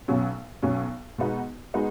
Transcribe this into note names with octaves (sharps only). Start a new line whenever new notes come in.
B1 B2 F#3 C#4
B1 B2 F#3 C#4
B2 G#3 B3 D#4 F#4
G#3 B3 D#4 F#4